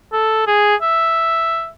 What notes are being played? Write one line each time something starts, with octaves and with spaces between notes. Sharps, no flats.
A4
G#4
E5